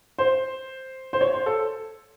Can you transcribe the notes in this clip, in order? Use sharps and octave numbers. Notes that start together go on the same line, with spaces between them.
C5
C5
C#5
C5
A4